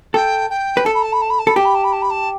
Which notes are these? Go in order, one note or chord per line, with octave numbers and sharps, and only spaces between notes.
A4 G5
G5
B4
A4 A5
B5
A5
B5
A5
B5
A5
A4 B5
G4 A5
B5
A5
B5
A5
B5
A5